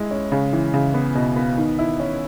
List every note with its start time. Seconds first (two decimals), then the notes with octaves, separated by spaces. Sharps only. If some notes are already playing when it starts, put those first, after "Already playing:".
Already playing: G#3 E4
0.11 C#4
0.32 C#3
0.53 E3
0.74 C#3
0.94 B3
1.15 B2
1.36 B3
1.58 D#3
1.79 E4
2.00 C#4